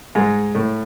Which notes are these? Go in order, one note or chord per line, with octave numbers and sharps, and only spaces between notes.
G#2 G#3
A2 A3